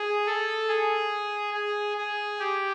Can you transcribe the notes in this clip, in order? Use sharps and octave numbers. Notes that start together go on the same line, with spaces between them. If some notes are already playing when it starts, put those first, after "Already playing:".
Already playing: G#4
A4
G#4
G#4
G#4
G4